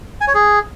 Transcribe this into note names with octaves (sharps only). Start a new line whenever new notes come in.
G#5
C#5
G#4